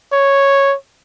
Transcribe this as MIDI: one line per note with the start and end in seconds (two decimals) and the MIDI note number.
0.12 0.75 73